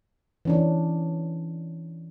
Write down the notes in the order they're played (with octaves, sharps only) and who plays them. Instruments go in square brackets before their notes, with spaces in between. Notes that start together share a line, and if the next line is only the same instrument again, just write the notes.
[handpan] E3 C#4 D4